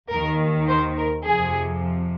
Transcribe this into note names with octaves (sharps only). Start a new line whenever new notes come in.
D#2 D#3 A#4
C5
A#4
F2 C3 F3 G#4